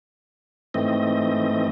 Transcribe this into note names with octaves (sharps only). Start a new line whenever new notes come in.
G#2 E3 A3 C4 D#5